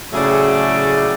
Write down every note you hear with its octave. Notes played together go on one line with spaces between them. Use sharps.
A2 C#3 F#3 A3 G#4 D5